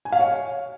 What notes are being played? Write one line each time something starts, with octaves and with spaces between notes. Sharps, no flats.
G#5
F5
C#5